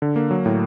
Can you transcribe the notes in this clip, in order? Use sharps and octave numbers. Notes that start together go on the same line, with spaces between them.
D3
A#3
F#3
A2